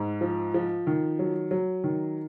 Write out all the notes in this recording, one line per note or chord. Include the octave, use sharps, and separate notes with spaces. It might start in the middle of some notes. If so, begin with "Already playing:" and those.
Already playing: G#2
F3
F3
D#3
F#3
F#3
D#3